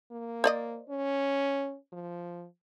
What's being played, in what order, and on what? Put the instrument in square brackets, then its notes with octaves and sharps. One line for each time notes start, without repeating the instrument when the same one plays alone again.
[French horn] A#3
[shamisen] C5 D5 D#5
[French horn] C#4
F3